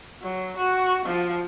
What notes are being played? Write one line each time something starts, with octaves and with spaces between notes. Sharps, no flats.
F#3
F#4
F3